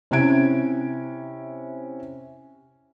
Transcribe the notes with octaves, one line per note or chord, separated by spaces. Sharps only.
C3 C#4 E4 G#6 D7